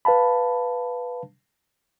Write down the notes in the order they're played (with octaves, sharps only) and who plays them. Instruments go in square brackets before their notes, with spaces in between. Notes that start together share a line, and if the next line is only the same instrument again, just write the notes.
[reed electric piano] B4 F5 A5 B5